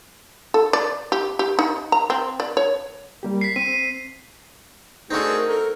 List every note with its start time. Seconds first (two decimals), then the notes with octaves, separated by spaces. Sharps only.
0.54 A4
0.73 D5
1.12 G4
1.39 G4
1.59 D#4
1.92 A#5
2.10 C4
2.40 D5
2.57 C#5
3.23 G3 A#3 G4
3.41 B6 C7
3.56 C4 D#7
5.11 A3 C4 D4 D#4 F#4 G#4
5.26 A#4
5.48 A4 A#4